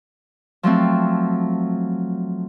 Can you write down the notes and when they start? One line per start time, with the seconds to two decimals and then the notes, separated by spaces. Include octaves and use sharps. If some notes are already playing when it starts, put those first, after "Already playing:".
0.63 F3 F#3 A3 C4